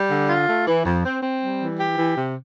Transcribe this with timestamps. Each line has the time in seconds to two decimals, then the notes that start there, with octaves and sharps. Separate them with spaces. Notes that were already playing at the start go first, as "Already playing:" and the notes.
Already playing: G3
0.10 D3
0.29 F4
0.48 A3
0.68 E3
0.85 F2
1.04 C4
1.23 C4
1.41 G3
1.61 E3
1.80 G4
1.98 E3
2.16 C3